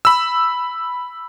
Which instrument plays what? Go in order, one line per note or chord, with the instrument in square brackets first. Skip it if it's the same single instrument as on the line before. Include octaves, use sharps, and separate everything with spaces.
[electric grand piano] B5 E6